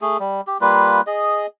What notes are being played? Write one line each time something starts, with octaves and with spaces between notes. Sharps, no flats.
A3 G#4
G3
G4
G3 A#3 F4 B4
G#4 D#5